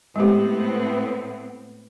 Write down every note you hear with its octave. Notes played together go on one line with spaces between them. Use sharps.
A2 G#3 B3 C4 G4